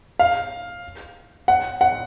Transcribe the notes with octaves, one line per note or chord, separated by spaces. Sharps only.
F5
F#5
F#5